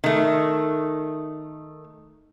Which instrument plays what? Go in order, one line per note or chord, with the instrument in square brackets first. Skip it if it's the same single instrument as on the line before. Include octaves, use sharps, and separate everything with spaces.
[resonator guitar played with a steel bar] D#3 A3